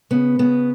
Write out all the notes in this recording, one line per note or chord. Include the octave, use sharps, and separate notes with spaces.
C#3 B3
C#3 B3